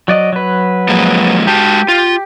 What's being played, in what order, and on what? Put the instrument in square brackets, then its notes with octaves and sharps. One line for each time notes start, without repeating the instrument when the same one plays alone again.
[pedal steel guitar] F#3 D5 D#5
F#3 B4
[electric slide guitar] F3 G#3 A#3
[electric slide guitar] G#3 F#4 A5 [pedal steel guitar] G4
[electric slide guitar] F4